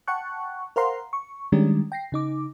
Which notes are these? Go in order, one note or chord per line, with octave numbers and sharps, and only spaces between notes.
F#5 G5 A5 C#6 F#6
A#4 C5 F5 F#5 A#5 C6
C#6
D#3 G3 G#3 C#4 D4 G4
G5 A#6 C7
C#3 D#4 D6